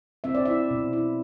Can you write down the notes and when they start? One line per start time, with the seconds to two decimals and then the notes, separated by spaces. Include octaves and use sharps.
0.24 C4 E5
0.35 D5
0.45 E4 E5
0.71 B2
0.93 E4